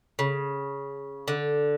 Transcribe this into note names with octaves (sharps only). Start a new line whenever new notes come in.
C#3
D3